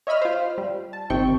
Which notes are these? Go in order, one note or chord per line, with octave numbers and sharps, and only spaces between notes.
C#5 D#5 E5 B5 F6
F4 C5
G3
A5
G1 C3 D#3 C4 G5 C#6